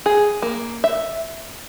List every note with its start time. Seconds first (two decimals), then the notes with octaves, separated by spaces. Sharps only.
0.06 G#4
0.42 A#3
0.84 E5